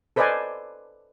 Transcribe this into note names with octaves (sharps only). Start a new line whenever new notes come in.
A4 B4 C5 D5 D#5 G#5